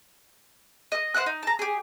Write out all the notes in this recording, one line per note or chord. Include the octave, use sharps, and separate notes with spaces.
D#5 D#6
C5 D#5 F#5 F#6
D#4
A5 A#5
G4 G#4